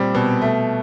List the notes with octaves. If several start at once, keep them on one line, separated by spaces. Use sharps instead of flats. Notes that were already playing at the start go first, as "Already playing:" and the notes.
Already playing: A#2 G3 C4
B2
A3